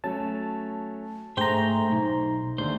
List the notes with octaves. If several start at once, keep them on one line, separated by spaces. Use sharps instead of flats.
F#3 A3 C#4 A5
G#2 A3 D4 G#4 C5 G5 A#5
B1 D#4
D#2 D3 A3 D4 C5